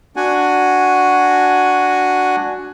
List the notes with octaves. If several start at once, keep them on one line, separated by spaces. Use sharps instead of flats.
D4 F#4 F#5 G#5